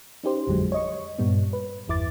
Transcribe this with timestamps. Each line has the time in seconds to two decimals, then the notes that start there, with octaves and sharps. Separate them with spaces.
0.24 C#4 D#4 G4 C5
0.47 A1 F2 D3 F#3 G#3
0.72 C#5 D#5 C#6
1.18 G2 A#2 G3 B3
1.53 B4
1.88 G1 E2 E4 D6 A6